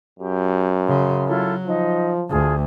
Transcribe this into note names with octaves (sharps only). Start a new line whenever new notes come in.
F#2 G4
C#3 C6
F#3 E4 F4 A4
F3 D#4
D2 F4 G#4 A5